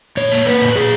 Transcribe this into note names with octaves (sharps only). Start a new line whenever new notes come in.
A#2 C#5
A#3
A#3 B4
A#2
A#2 G#4